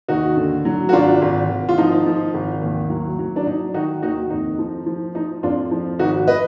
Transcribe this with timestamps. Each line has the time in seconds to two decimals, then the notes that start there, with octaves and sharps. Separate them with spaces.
0.08 D#2 D#4 F#4
0.37 D3
0.65 F#3
0.89 F#4
0.93 G#1 D4 F4
1.22 G#1
1.49 G#1
1.69 F4
1.78 F3 D#4
2.06 F3
2.34 G#1
2.62 D#2
2.90 F#3
3.19 F#3
3.36 D4
3.47 F#3 D#4
3.74 D#3 D#4 F#4
4.02 D#2 D#4 F#4
4.30 F2 D#4
4.59 F3
4.86 F3
5.15 F3 D#4
5.43 F2 D4 F4
5.71 F3
5.99 G#1 D#4 F#4
6.28 B4 D#5